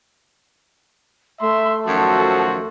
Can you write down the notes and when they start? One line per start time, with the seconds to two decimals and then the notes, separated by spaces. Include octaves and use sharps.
1.41 A3 E5 C6
1.87 F#2 D#3 F3 F#4 A4